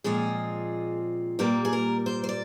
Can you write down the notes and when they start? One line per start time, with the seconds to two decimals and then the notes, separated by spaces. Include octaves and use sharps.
0.04 A#2 F3 G#3 C4 G#4
1.39 A#2 G3 A#3 G4
1.65 G#4
1.73 A#4
2.06 C5
2.24 C5
2.29 D5